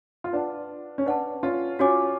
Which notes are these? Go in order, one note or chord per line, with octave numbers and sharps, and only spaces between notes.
F4
D4 B4 F#5 A5
C#4
D4 B4 F#5 A5
C#4 F4
C#4 F4 F#4 C#5 G#5 D6